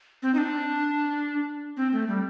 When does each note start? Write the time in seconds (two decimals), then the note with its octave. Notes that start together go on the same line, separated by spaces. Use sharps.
0.22 C4
0.34 D#4
0.38 D4
1.77 C4
1.93 A3
2.08 G3